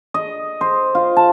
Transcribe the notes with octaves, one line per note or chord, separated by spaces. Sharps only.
D#5
C5
F4
A5